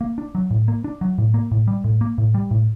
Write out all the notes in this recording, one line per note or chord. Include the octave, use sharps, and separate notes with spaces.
A#3
D4
F#3
A2
A#3
D4
F#3
A2
A#3
A2
G3
A2
A#3
A2
G3
A2